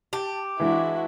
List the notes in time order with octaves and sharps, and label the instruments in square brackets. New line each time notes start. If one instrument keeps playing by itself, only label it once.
[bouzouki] G4 [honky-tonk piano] A5
[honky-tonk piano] E3 G#3 D4 [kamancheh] E4 F#4